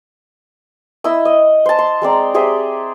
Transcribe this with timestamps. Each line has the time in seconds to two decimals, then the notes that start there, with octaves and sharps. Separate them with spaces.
1.04 E4 D#5 E6
1.25 D#5
1.66 C5 A5
1.79 C6
2.02 G#3 C4 D5 A#5
2.34 G4 G#4 C5 E5